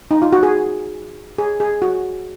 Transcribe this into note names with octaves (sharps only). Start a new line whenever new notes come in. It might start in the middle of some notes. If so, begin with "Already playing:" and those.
D#4
F4
F#4
G#4
G#4
G#4
F#4